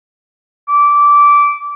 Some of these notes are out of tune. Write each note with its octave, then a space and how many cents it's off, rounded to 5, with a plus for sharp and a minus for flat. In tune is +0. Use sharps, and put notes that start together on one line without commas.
D6 -15